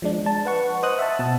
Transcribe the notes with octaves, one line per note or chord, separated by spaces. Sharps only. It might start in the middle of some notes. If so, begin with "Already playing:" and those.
F3 G#3 D4
A5
B4 F#5 C#6
C5 D#5 D#6 F#6
E5 F#5 A5
B2 A5